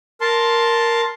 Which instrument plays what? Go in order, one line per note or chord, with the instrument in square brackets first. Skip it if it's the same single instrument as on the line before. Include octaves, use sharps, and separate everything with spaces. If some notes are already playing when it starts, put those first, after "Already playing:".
[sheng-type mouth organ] A#4 A5 C6